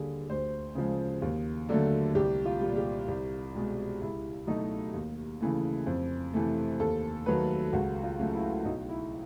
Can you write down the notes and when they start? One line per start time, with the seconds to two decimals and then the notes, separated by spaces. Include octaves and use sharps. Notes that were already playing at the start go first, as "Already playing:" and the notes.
Already playing: D#2 D3 G3 G#4
0.30 D2 C5
0.75 C#3 F3 G#3
1.22 D#2
1.69 D3 F#3 A3
2.15 C2 G4
2.45 F4
2.61 A#2 G3
2.77 G4
3.08 C2
3.55 B2 G#3
4.01 C#2 E4
4.47 B2 F#3 A3 D#4
4.94 D#2
5.41 C#3 E3 A3
5.86 F2
6.34 C3 E3 A3
6.79 D#2 A4
7.26 D#3 F#3 A3 B4
7.73 C#2 F#4
8.04 F4
8.19 C#3 F#3 A3
8.34 E4
8.65 B1 D#4
8.89 E4